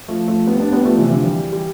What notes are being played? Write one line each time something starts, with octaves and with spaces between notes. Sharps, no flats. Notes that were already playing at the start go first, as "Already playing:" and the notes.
F3 A3
F3 A3
G3 B3
B3 D4
G3 B3
F3 A3
C3 E3
D3 F3
E3 G3
G3